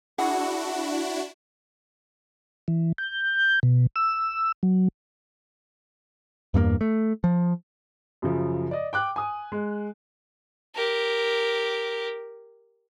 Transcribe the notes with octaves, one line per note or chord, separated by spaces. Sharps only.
D4 E4 F#4 G#4 F#5
E3
G6
B2
E6
F#3
E2 G2 A3 A#3
A3
F3
F#2 C#3 F3
D5 D#5
G5 D6 F#6
G#5 D#6
G#3
G4 A#4